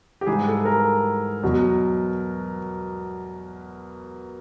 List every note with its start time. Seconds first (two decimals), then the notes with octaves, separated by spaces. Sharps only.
0.21 G4
0.26 G#2 E3 G3 G#4
0.47 A4
0.65 A#4
1.43 E2 B2 F#3